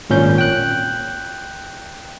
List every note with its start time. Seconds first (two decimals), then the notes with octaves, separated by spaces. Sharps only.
0.10 G#1 A#2 C#4 G6
0.38 G5 F#6